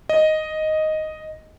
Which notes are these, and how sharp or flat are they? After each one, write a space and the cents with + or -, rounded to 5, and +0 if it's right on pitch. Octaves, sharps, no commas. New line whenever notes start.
D#5 +0